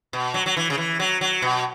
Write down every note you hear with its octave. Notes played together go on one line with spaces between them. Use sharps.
B2
F#3
F#3
E3
C#3
E3
F#3
F#3
B2